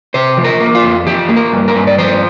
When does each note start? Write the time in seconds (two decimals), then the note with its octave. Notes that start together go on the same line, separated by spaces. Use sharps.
0.14 C3 C5
0.37 F3
0.44 A#4
0.60 A#3
0.75 F4
0.83 F2
1.07 F3 G4
1.29 A#3
1.36 A#4
1.52 G2
1.68 A#4
1.75 G2
1.87 D5
1.98 F3 C5